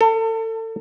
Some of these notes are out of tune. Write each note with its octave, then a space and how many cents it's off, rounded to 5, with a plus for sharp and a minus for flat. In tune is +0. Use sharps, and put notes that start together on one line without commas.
A4 +30